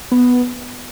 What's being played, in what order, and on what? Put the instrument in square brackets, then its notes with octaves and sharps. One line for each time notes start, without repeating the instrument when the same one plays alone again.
[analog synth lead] B3